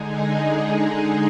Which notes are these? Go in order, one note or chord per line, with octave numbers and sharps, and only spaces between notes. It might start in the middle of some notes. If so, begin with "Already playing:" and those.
Already playing: D3 G#3 D#4 G#4